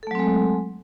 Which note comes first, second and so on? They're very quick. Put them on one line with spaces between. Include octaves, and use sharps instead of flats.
A4 A3 F#3 C4 G#3